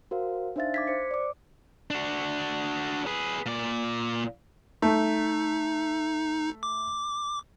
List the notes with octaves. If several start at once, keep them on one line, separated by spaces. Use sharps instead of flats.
F#4 A#4 C5 F5
D4 D#4 C5 E5 F5 A6
D6 G#6 B6
C5 C#7
D5 D6
D4 F#4
G#4 B4
A#2 D5
A3 D#4
D6